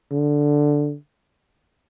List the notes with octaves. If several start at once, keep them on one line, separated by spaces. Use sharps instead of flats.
D3